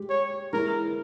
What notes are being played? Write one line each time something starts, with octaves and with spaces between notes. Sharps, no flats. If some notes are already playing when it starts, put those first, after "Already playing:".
Already playing: G#3 G4
C#5
E3 G#3 E4 A#4